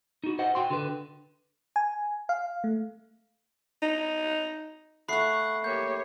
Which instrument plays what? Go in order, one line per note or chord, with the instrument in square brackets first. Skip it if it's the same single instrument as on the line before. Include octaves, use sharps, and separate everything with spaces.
[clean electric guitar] D#4 F#4
C5 D#5 F#5
F#4 G5 C6
D3 B4
[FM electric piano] G#5
F5
A3
[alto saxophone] D#4
[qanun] A3 F5 [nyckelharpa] F#5 C#6 [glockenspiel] B5 F#6 C7
[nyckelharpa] A#3 G4 [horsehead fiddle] C#5 [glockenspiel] G6